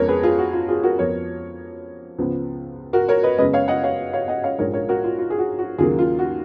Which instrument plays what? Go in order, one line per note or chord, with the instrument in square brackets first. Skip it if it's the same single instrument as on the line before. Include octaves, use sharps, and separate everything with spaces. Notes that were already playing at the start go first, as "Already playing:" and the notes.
Already playing: [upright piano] F2 C#3 G#3 B3 A#4 C#5
G#4 B4
F4 G#4
F#4
F4
F4 G#4
F#4 A#4
F2 F3 B3 A#4 C#5
C#2 C#3 F3 B3
F#4 A#4
A#4 C#5
B4 D#5
F#2 C#3 G#3 B3 B4 D#5
C#5 F5
D#5 F#5
C#5 F5
C#5 F5
D#5 F#5
C#5 F5
A#1 G#2 F3 G#3 A#4 C#5
A#4 C#5
F#4 A#4
F4
F4
G#4
F#4
F#4
D#2 C#3 F#3 A#3 F4 G#4
F4
F#4